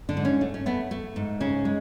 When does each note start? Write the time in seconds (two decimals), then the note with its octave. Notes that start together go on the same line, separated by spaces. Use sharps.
0.09 D3 D4
0.17 G#2
0.25 C#4
0.41 A3
0.54 C#4
0.66 A3 B3
0.91 A3
1.16 G#2
1.40 C#3 C#4
1.65 G#3